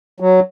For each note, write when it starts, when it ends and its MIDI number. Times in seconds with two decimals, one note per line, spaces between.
0.20 0.40 54